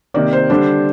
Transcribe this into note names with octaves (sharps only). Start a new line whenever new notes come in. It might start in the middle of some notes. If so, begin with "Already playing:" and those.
C3 D#3 A#3 D5
C5
D3 G3 D4